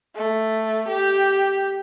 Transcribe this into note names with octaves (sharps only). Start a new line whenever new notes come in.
A3
G4